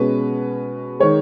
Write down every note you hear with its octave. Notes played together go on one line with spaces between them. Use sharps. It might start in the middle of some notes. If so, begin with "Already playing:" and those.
Already playing: B2 G#3 C#4 B4
D#3 G#3 C#5